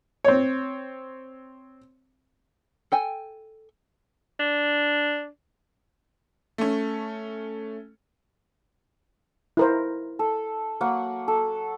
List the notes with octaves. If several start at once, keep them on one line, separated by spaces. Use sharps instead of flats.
C4 C#5
A4 G5 G#5
D4
A3 C#4
E4 A#4 C5
A4
F#3 A#3 F#5
A4